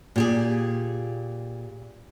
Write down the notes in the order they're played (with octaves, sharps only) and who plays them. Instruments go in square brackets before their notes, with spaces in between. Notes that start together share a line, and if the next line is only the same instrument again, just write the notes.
[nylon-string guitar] A#2 G4 G#4